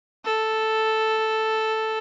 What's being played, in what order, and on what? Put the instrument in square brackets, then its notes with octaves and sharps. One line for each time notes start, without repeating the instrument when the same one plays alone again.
[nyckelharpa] A4